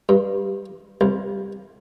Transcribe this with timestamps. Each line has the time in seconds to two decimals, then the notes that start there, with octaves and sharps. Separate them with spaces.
0.09 G2
1.01 C2